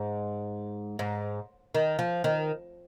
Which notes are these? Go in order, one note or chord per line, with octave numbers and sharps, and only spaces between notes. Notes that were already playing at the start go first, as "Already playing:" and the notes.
Already playing: G#2
G#2
D#3
F3
D#3